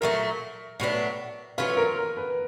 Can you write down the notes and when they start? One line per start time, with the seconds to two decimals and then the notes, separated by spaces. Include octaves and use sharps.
0.01 A#2 F#3 A3 A#4
0.80 A2 F#3 B3 D4
1.58 F#3 A3 C#4 F4 B4
1.77 A#4
1.97 A#4
2.17 B4